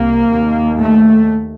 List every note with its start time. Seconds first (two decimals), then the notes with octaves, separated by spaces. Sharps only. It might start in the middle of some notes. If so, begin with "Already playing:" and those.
Already playing: C2 C3 A#3
0.27 D#2
0.80 A3